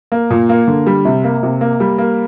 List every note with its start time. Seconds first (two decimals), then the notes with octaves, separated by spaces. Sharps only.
0.12 A#3
0.30 A#2
0.49 A#3
0.67 D3
0.87 G3
1.05 C3
1.24 A#3
1.43 C3
1.61 A#3
1.80 G3
1.98 A#3